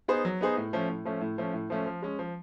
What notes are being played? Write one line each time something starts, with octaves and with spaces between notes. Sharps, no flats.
B3 D#4 G#4 C5
F#3
B3 D#4 G#4 C5
A2
F3 A3 C#4
A2
F3 A3 C#4
A2
F3 A3 C#4
A2
F3 A3 C#4
F3
G#3 C#4
F3